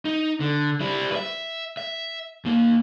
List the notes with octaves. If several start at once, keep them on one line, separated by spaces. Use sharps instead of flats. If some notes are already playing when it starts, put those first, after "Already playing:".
D#4
D3
G3 E4
B4 E5
E5
D#2 A#3